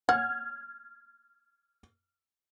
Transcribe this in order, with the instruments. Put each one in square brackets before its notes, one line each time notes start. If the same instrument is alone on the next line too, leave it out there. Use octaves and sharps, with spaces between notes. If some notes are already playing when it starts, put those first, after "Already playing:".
[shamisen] F#5 [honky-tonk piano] F6 G#6